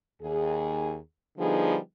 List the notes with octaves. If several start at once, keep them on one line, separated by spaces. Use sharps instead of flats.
D#2 G#4
D3 F3 G3 B3 D#4 G#4